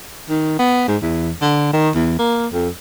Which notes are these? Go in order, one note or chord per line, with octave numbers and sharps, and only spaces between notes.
D#3
B3
G#2
E2
D3
D#3
E2
A#3
F2